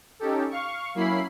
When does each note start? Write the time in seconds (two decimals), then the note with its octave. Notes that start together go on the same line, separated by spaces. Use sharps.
0.19 C#4 D#4 G4 A4
0.51 F5 C#6
0.95 F#3 A#3 C#4 E4 B5 C7